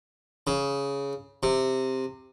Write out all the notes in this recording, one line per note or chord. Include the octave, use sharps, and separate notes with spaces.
C#3
C3